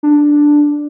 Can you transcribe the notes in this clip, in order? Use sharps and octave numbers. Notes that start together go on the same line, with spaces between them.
D4